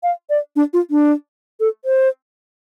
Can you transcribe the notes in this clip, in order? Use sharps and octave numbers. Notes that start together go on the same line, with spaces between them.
F5
D5
D4
F4
D4
A4
C5